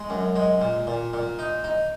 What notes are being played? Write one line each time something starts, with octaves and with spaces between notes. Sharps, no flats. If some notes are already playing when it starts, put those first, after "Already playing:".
Already playing: G#3
F#2
G#3
A#2
A#2
A#2
D#4
D#4